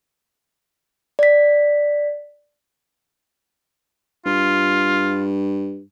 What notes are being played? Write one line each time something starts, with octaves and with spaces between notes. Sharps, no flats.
D5 B6
G2 F4